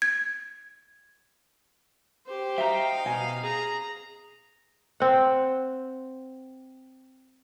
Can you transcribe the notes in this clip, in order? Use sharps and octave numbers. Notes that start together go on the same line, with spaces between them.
G#6
G4 C5
D#4 E5 F5 G5 A#5
B2 G#5
G#4 A#5
C4 F#5